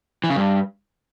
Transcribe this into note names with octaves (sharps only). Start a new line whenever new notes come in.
E3
C#3
G2